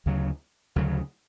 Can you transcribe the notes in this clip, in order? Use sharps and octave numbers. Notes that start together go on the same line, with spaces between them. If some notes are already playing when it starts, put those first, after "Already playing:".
D2 C#3 F#3
D2 C#3 F#3